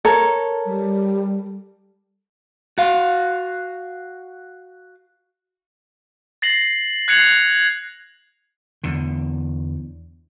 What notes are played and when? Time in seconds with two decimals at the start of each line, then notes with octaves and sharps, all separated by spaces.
0.05 A4 A#4 C#5
0.66 G3
2.78 F#4 F5
6.42 A6 A#6 C7 F#7
7.08 F#6 G#6 C7 C#7 F7 F#7
8.83 E2 D3